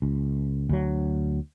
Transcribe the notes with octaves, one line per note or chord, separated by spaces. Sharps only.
C#2
D2 F#3